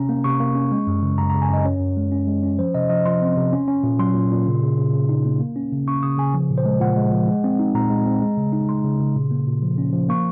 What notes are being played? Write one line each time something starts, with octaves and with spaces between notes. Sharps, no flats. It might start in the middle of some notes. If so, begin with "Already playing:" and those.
Already playing: C3 C#4 A#5
A#3
C3 C#6
A#3
C#4
G#3
F#2
C#3
F#2 A#5
A#5
C#3
G#5
F#2 D#5
C#4 C#5
F#2
G#3
C#4
G#3
C#4
F3 C5
C3 D#5
F3 D#5
F3 C6
C4
C3
C#4
C#4
A#2
F#3 C6
A#2
A#2
C#3
C#3
C#3
C#3
D#4
A#3
A#3
C#4
C#3
C#4 C#6
C#3 D#6
C#3 G#5
F3
A#2
C5
G#3
A#2 F#5
G#3
F3
G#3
C4
D#4
A#2 A#5
G#3
C4
G#3
C#3
D#4
G#3 C6
C#3
C#3
A#2
A#3
A#2
F3
C#4
F3
A#3 C#6